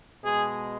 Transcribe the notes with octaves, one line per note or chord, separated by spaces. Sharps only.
B2 G#3 G#4